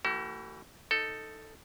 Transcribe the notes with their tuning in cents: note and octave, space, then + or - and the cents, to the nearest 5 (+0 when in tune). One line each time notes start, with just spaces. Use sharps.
E3 +0 A3 +40 F#4 +45
D#4 +0 A4 +5